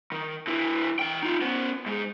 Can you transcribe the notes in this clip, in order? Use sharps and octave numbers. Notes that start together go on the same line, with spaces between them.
D#3
D3 E4
E3 G5
D#4 F4
B3 C#4
G#2 G#3